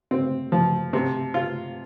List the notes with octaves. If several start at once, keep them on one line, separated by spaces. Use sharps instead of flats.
C4
F3
C3
F4